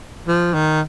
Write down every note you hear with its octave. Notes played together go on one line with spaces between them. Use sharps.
F3
D#3